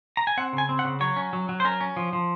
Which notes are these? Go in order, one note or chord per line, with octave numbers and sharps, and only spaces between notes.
A#5
G#5
C4 F#5
C#3
G#5
C4
F#5
C#3
F#3 C#5
C#4
F#3
F#3
C5
C#4 A#4
C#4
F3
F3